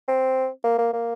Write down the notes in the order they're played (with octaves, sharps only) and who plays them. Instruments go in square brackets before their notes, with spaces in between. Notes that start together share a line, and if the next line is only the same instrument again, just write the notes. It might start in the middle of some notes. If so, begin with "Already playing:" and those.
[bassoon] C4
A#3
A#3
A#3